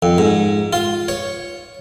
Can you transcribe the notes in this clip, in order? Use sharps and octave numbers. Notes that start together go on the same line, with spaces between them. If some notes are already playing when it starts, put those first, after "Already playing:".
F2
G#2
F4
C#5